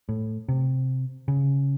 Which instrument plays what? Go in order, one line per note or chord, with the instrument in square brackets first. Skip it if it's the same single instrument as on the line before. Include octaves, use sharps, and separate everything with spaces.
[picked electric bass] A2
C3
C#3